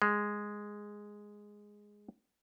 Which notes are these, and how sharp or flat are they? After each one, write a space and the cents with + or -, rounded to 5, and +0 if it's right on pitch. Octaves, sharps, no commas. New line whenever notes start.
G#3 -5